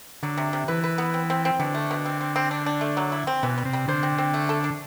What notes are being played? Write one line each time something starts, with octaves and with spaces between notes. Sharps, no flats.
D3 F#3
C3
C3
E3 B4
B4
B3
C4
C4
C4
B2 D3
A3
B2
C4
C4
C4
D4
D4
A3
F#3
E4
C4
B2 E3
G3
C3
G3
D3 C5
C4
C4
A3
A4
D4